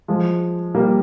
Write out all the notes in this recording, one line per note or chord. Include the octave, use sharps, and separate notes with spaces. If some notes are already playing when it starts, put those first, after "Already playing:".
F3 G#3
G3 A#3